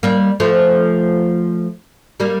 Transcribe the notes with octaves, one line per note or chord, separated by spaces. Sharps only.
G3 A#3
F3 A3
G3 A#3